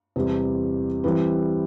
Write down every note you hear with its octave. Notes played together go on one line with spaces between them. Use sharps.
E2 C3 G3 C4
E3 G3 C4 E4 B4